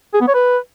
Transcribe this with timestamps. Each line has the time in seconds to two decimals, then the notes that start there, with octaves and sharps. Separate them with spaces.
0.14 G#4
0.21 B3
0.28 C#5
0.34 B4